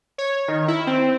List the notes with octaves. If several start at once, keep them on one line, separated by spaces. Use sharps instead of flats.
C#5
D#3
E4
C4